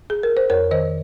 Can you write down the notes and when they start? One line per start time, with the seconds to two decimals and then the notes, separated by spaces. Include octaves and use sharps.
0.10 G#4
0.23 A#4
0.37 C5
0.50 F2 A#4 C#5
0.71 D#3 C5 D#5